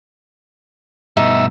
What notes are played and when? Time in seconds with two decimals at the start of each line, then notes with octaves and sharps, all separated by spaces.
1.17 G2 B2 D#4 E5